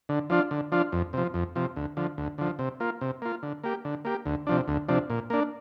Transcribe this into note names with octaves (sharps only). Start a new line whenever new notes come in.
D3
F3 D4 F4
D3
F3 D4 F4
F2
C3 F3
F2
C3 F3
D2
D3 F3
D2
D3 F3
C3
A#3 F4
C3
A#3 F4
D3
A#3 G4
D3
A#3 G4
D2
C3 F3 D4
D2
C3 F3 D4
A#2
A#3 D4